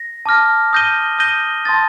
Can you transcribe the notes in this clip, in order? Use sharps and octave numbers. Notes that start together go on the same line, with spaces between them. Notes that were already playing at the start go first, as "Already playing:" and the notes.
Already playing: A#6
A5 D6 F6 A#6
D#6 G6 A#6 D#7 G7
D#6 G6 A#6 D#7 G7
A5 C6 D#6 A6